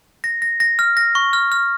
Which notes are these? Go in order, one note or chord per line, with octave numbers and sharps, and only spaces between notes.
A#6
A#6
A#6
F6
A#6
C#6
F6
F6